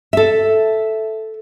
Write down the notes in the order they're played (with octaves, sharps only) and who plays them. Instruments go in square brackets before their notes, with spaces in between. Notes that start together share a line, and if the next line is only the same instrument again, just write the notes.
[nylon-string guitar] A4 E5